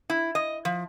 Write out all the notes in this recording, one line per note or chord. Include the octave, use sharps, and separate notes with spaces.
E4
D#5
F3